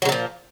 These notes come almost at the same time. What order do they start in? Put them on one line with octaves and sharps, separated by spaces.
F#3 C#3 A#2 F3